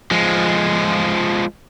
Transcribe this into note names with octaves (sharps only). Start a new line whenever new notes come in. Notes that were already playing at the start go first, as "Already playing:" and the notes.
F3 G#3